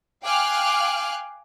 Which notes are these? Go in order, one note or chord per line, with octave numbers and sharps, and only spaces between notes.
F5 G5 G#5 D6 F6 F#6